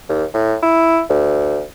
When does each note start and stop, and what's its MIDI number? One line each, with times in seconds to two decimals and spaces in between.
0.09 0.24 39
0.34 0.55 45
0.63 1.02 64
1.10 1.63 38